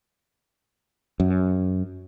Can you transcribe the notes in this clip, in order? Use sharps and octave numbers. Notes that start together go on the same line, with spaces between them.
F#2